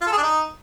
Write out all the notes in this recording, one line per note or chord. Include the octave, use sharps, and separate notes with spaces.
F4
A4
G#4
D4
D#4